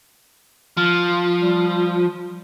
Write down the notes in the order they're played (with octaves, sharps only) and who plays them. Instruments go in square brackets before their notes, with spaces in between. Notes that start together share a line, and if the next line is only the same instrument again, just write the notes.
[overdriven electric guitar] F3 [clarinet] F6
[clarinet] G3